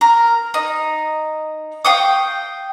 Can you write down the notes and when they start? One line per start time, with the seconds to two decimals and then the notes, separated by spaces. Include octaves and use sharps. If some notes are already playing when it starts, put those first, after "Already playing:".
0.01 A#4
0.54 D#4
1.85 F5 G5 C#6 D#6